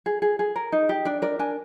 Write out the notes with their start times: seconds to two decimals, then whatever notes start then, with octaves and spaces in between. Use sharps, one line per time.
0.06 G#4
0.22 G#4
0.39 G#4
0.56 A#4
0.72 D#4
0.89 G4
1.05 D4 D5
1.22 A#4 D5
1.39 D4 G#5